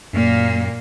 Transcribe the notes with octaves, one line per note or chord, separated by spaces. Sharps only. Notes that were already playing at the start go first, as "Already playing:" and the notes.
F#2 A#2 A#3